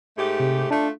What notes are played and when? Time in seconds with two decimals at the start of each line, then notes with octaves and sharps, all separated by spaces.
0.18 G#2 A3 G4
0.40 C3
0.71 A3 D4 F4